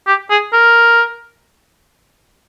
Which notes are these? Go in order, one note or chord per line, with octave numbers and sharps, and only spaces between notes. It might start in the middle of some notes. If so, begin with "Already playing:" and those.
G4
G#4
A#4